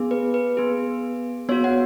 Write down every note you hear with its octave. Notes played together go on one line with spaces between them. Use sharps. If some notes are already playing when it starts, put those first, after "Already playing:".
Already playing: B3 G#4
B4
B4
B3 G#4
B3 F#4 C#5
F#5